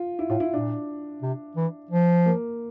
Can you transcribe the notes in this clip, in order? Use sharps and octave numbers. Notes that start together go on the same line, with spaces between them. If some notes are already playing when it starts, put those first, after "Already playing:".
Already playing: F4
E4
A2 F4
E4
A#2 D4
C3
E3
F3
A#3